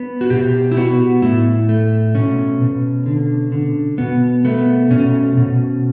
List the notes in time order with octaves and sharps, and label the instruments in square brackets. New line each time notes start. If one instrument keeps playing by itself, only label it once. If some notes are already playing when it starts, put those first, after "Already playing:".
Already playing: [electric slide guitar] B3
F#4
B2 G4
E4
B3 F#4
A2 E4
A3
B2 C#4
B2
D3
D3
B2 B3
A3 B3
B2 C#4
B2